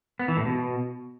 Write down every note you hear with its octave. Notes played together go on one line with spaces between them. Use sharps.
B3
E3
A2
B2